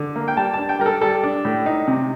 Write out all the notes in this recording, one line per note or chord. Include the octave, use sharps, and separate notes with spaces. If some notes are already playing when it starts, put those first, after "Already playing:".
Already playing: D3
A#3
G5
G3 A5
D4 A5
G5
G3 A#4
A4
G3 A4
D4
A2
D#4
C3